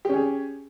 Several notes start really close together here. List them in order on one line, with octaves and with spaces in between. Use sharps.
G4 C#4 G#4